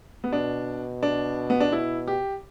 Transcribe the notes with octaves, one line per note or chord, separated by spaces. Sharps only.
B3
B2 D4
D4
B3
D4
E4
G4